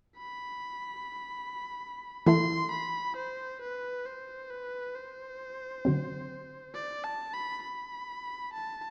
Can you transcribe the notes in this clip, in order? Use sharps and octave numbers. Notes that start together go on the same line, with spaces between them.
B5
E3 A3 E4 A4 C6
B5
C5
B4
C5
B4
C5
D3 F#3 C4
D5
A5
B5
B5
A5